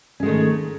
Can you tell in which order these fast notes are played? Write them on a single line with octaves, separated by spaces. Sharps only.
C#4 G#3 A3 D#3